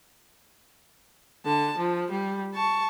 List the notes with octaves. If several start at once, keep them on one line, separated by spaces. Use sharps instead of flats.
D3 A5
F3
G3
A5 C#6